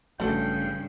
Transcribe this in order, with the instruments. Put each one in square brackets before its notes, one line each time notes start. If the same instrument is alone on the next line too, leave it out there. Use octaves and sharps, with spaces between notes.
[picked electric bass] A1 F#3 [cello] G2 C#3 [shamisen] A3 A4 [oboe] G5